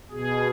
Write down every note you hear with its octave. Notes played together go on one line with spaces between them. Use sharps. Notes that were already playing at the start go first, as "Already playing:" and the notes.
B2 G#4